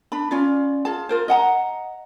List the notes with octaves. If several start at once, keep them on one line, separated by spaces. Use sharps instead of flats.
D4 B5
C#4 F4 D5
F4 G#4 A5
F4 A#4 C5
D#5 F#5 A5 A#5